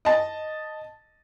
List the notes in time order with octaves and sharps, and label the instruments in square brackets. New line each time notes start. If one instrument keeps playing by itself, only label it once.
[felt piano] D#5 A5